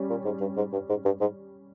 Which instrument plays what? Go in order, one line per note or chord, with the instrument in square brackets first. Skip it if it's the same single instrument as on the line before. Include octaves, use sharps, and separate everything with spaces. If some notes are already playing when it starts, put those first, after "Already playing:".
Already playing: [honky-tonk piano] G3 C#4
[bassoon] A#2
G#2
G2
G#2
G2
G#2
G2
G#2